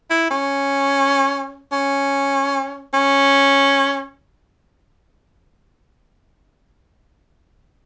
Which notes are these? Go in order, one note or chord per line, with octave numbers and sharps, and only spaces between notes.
E4
C#4
C#4
C#4